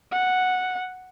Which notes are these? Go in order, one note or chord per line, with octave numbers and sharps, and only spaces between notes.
F#5